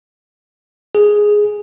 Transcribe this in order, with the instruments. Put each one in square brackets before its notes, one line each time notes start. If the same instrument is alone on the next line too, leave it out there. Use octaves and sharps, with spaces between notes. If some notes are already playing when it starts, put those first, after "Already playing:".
[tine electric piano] G#4